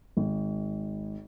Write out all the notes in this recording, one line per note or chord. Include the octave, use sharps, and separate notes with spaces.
G#1